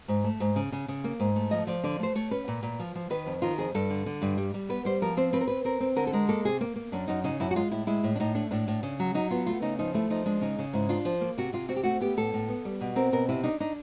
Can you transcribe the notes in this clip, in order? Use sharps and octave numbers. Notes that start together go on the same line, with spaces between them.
G#2
A3
G#2
C#3
C#3
C#3
A#3
G#2
A3
F3 D#5
F3 D5
D3 D5
A3 C5
A3 C#5
C#4 B4
A#2
A#2
F3
F3
D#3 B4
F2
D#3 F4
F2 G#4
G2 A4
D3
D3
G2
G3
G3
B3 B4
G3 C5
F3 A#4
C4 C5
C4 B4
A#4
C4 B4
C4 A#4
C4
D3 A#4
A4
G#3 A#4
A#3 A4
C3 G#4
A#3
A#3
F#2 D4
F#2 D#4
C#3 D#4
F#2 E4
F#4
G#3 F4
A2 E4
G#3 E4
A2
D4
A2 D#4
A3 D4
A2 D4
A2
C#3
F#3
F#3 D#4
B3 F4
A3 F4
C#3 D#4
F3 D#4
A3 E4
F3 D#4
G#3 D4
C#3 D#4
C#3
G#2 E4
D4 F4
F3
A#3
C3 F#4
C3 F4
C4 F#4
G4
A3 F#4
B3 G4
A2 A4
A2
B3
G3
B2
C4 A#4
B2 A#4
C3 E4
D4 D#4
D4 D#4